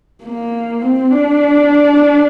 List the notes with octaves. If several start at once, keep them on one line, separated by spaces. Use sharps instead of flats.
A#3
C4
D4